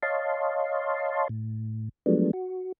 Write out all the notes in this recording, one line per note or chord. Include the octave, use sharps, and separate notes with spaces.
C#5 D#5 F5 A5 C6
A2
F3 F#3 G#3 A3 B3 D4
F#4